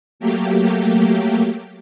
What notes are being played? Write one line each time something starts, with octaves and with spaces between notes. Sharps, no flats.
F#3 A3 A#3 G4